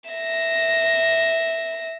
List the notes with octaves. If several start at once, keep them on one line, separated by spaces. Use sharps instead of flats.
E5 A#6